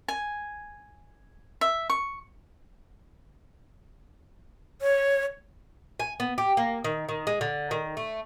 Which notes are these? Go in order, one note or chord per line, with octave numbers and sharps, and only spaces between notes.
G#5
E5
C#6
C#5
G#5
B3
G4
A#3
D#3
D#3
G#3
D3
D#3
A3